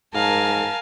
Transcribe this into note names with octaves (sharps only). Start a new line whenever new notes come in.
G#2 A#4 F5 G#5 A5